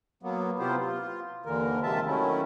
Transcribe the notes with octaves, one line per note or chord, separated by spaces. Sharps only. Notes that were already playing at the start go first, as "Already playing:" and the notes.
F#3 A#3 B3
C3 B3 E4 F4 G4 C5
F4
D#2 D3 E3 A#4
C3 D#3 G#3 F4 E5 A5
D#3 F#3 A3 C#4 E4